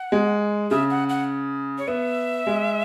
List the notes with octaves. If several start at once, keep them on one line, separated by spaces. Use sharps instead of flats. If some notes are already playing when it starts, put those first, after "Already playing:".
Already playing: F#5
G#3
C#3 E5
F#5
F#5
C#5
B3 E5
G#3